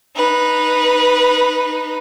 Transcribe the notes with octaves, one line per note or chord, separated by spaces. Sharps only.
D#4 B4